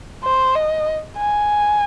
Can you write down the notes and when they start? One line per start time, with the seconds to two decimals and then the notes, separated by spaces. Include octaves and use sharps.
0.24 C5
0.55 D#5
1.17 G#5